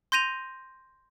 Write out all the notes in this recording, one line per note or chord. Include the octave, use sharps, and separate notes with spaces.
C6 G6 A#6 D#7 F7